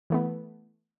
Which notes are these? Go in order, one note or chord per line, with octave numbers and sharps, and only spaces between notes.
E3 A3 B3